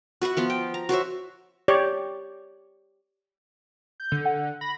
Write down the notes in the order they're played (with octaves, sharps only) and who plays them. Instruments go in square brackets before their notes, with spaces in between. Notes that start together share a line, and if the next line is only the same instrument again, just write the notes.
[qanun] F#4 B4 E5 F#5
F3 B3 F4
G5
A#5
F#4 C5 C#5 E5
[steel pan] G4 C#5 D5
[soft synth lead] G6
[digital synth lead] D3
[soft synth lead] F#5
[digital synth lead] B5 [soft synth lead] A#6